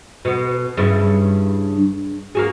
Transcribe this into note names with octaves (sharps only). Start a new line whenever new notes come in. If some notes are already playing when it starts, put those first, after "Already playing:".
B2 B3
G2 C#3 E4
A#3 F#4 G#4